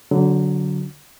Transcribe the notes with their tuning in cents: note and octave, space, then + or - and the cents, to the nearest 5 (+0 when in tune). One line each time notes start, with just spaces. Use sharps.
D3 -25 F#3 +0